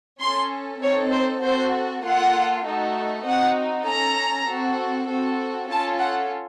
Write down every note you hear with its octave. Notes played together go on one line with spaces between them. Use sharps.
C#4 A4 C6
C4 D#4 A4 C#5
C5
C4 F#4 A4 C5
A#3 F4 A4 F#5
A3 D#4 F#4 A4
C4 D#4 F#4 F#5
C#4 A4 A#5
C4 F#4 A4
C4 F#4 A4
C#4 F4 A4 A5
F#5